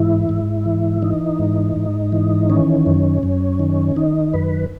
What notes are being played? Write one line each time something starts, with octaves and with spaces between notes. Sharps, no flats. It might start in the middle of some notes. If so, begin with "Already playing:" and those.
Already playing: G#2 E3 E4
G#2
E3
E3 D#4
G#2
G#2
E3
D#3 C#4
F#2
F#2
D#3
D#3 D#4
F#2 B4